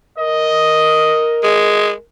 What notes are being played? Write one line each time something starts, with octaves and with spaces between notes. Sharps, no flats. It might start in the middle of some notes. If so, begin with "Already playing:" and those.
A#4 D#5
G#3